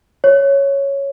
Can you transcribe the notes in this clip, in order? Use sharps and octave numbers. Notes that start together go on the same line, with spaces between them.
C#5